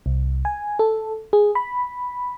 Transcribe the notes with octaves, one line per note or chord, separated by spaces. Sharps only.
C2
G#5
A4
G#4
B5